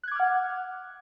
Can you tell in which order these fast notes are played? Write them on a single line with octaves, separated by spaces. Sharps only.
F#6 G#6 D6 F6 F#5